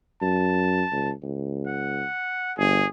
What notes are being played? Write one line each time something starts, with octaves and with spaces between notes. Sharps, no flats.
F#2 A5
C#2
C#2
F#5
G1 G#4